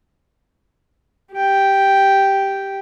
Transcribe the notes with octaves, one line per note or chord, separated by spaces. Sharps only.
G4 G5